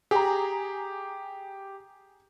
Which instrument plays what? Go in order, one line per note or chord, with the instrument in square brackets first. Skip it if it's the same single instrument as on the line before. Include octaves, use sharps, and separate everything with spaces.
[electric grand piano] G4 [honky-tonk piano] G#4 A#5